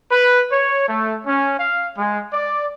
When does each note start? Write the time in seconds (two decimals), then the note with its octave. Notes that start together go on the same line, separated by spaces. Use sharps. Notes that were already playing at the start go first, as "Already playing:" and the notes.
0.11 B4
0.52 C#5
0.88 A3
1.27 C#4
1.59 F5
1.96 G#3
2.32 D5